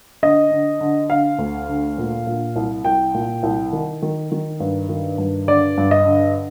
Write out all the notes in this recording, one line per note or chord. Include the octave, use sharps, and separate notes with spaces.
D3 D#5
D3
D3
D3 F5
D2
D3
A#2
A#2
C2
C2 G5
A#2
C2
D#3
D#3
D#3
G2
D#3
G2
D3 D5
G2
D#5
D3